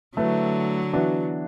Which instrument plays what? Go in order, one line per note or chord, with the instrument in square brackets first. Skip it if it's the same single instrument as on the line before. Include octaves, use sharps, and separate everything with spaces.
[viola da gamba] D3 F#3 [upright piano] A3 E4 B4
[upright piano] E3 B3 D4 F#4